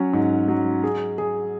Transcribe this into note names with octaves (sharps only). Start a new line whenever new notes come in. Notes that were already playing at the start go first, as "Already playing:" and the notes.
Already playing: F#3 C#4
G#2
F#3
G#4
G#4